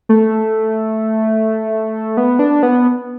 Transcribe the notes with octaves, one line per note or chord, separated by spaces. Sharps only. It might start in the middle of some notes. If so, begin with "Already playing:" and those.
A3
B3
D4
B3